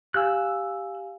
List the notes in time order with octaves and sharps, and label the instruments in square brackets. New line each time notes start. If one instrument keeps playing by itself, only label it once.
[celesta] G4 F5 G#5 [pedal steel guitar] E6 F#6